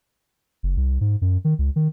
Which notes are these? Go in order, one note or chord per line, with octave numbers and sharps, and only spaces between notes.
F#1
C2
G#2
F#2
D#3
C#2
D#3